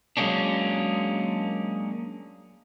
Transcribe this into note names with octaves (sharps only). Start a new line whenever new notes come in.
F#3 G#3 A#3 C#4 D4